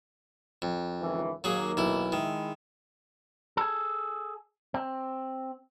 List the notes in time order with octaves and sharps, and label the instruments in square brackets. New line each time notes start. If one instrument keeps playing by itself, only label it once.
[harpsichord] F2
[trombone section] C#2 D#3 E3
[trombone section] D#2 A#3 [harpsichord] F#3 G#4
[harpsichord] B1 E4
[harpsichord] D#3 [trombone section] G#3 E4
[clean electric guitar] G#4 A4
C4